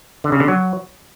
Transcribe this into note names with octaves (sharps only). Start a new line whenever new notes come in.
D3
C#3
D3
F#3